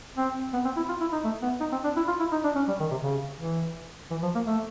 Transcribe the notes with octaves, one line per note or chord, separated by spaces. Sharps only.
C4
B3
C4
E4
F4
E4
D#4
A3
B3
D#4
C4
D4
E4
F4
E4
D#4
D4
C#4
G3
D#3
C3
C#3
E3
E3
F3
A#3
A3